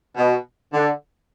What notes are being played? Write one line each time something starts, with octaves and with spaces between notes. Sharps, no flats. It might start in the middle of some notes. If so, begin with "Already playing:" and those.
B2
D3